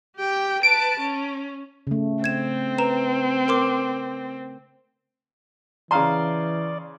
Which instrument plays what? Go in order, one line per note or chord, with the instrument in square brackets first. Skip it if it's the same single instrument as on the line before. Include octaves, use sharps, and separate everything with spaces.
[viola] G4 G5
[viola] B4 A5 [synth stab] D7
[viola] C#4
[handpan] C#3 A3
[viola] C4 [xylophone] G#6 E7
[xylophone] B4 A#5 E7
A#4 C6 D6
[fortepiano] C#3 F5 C6 [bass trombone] E3 [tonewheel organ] D5 [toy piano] A5 A#5